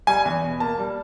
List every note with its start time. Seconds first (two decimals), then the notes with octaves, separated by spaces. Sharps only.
0.07 G3 G#5
0.25 E2
0.43 B2
0.60 A#3 A5
0.79 G3